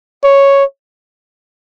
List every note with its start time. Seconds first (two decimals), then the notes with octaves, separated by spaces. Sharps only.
0.24 C#5